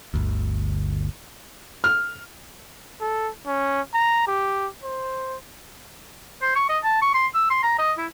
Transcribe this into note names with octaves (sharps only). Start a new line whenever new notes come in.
G1 D2
F6
A4
C#4
A#5
G4
C5
C5
C#6
D#5
A5
C#6
C6
E6
C6
A#5
D#5
E4